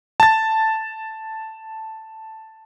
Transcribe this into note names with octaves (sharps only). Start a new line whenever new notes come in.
A5 A6